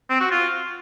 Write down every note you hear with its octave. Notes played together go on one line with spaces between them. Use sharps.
C4
F#4
F4